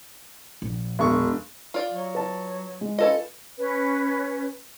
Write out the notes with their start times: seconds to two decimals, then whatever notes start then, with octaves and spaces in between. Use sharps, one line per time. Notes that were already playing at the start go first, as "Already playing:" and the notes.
0.62 A#1
0.99 E1 C#6
1.74 F4 D5
1.92 F#3
2.15 B4 A5
2.81 G#3
2.98 C#4 F4 A4 B4 D#5
3.58 C#4 B4